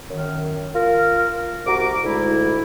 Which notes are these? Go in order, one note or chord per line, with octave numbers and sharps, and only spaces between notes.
F#2 D#3
F4 A#4
C2 F#4 A#5 D6
D2 G#2 G#3 E4